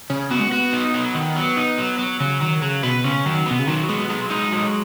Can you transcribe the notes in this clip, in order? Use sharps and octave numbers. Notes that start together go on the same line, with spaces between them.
C#3 C#4
B3 F#4
G#3
B3 F#4
D#4
F#3
D#3
F#3
D#4
F#3
F#3
C#3 F#3
D#3 F#3
C#3 F#3
B2 B4
C#3 C#4
D#3 F#3
B2 B3
C#3
D#3 F#3
G#3 B3
F#3 G#3
D#4
F#3